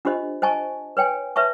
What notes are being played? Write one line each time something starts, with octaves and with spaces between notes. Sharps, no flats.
D4 F4 G4 C5 D#5
C5 D#5 G#5 A5 C#6
B4 C#5 G5 G#5
B4 C#5 E5 A5 C#6